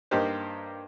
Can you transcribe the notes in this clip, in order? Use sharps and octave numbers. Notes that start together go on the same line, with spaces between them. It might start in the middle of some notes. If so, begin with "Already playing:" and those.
G2 A#3 D#4 G4 C5